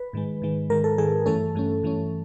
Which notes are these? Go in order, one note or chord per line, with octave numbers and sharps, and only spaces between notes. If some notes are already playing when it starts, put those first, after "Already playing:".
Already playing: B4
G#2 D#3 G#3
G#2 D#3 G#3
G#2 D#3 G#3 A#4
A4
G#2 D#3 G#3 G#4
G2 E3 A3 C#4 A4
G2 E3 A3 C#4
G2 E3 A3 C#4